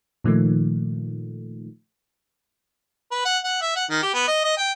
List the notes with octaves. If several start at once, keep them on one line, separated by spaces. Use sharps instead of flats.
A#2 D#3 F3 A3
B4
F#5
F#5
E5
F#5
D#3
G4
B3
D#5
D#5
G5